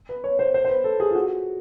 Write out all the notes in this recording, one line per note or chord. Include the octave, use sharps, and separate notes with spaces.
B4
C#5
C5
C5
C5
B4
A4
G#4
F4
F#4